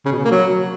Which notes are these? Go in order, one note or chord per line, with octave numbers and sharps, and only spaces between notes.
C#3
B2
C#3
A#3
F#3